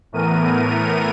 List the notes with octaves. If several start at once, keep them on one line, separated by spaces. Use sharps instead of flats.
A2 E3 A3 B3 A#4 D#7